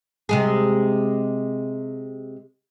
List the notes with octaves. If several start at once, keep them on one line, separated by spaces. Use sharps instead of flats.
C3 G#3 G#4